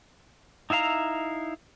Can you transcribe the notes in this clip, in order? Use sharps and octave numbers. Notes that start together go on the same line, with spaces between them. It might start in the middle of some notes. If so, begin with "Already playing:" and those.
D#4 E4 E5 F5 A#5